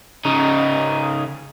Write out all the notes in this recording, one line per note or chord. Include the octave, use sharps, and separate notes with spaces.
C#3 D#4